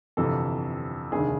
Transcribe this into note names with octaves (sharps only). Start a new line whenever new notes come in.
G1 F2 C3 E3 A4
F1 D#2 D3 G#4